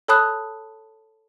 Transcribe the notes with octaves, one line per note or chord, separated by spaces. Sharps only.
A4 C#5 A5 B5 D#6 F#6